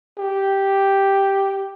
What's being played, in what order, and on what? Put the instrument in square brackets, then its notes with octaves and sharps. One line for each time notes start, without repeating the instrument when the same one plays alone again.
[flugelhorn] G4